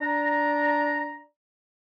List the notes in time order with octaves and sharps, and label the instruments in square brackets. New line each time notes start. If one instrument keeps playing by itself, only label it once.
[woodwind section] D4 A#5